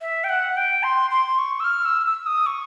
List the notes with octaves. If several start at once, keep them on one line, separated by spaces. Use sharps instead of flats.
E5
G5
F#5
G5
C6
C6
C#6
E6
F6
E6
E6
D#6
C#6